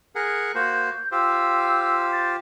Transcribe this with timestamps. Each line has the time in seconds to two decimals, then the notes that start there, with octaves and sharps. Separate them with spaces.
0.15 G#4 A#4 F#5
0.55 A#3 F#4 C5 G6
1.12 F4 G4 C5 E6
2.12 A6